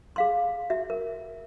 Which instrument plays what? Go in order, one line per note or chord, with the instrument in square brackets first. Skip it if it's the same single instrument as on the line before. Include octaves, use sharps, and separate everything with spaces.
[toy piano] G#4 F5 C6
F#4 E5
A#4